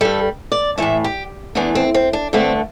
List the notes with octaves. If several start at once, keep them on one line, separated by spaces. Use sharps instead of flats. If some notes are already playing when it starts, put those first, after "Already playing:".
G2 G3 A4
D5
A2 E3 A3 E5
G4
E2 E3 A3 D4
C4
C4
D4
G2 D3 A3 C4